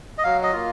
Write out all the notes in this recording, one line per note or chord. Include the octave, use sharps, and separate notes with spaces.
D#5
F#3 F5
D#5
A#3 F4